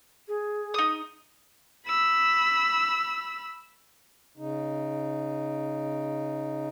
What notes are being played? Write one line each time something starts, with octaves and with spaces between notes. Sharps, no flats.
G#4
D#4 D#6
B5 E6
C#3 D#4